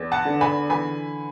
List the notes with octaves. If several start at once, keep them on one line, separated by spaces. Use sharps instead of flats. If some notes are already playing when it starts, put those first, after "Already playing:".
Already playing: E2
F#5 A5
D3
G#5 B5
E3 G#5 B5